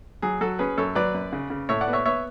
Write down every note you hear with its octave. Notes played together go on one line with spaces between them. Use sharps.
F#3 G#4
F#3 F#4 A4
C#4 G#4 B4
F#2 A4 C#5
F#3 B4 D5
F#2
C#3
C#3
A2 C#5 E5
D5 F#5
B3
C#5 E5
B3 C#5 E5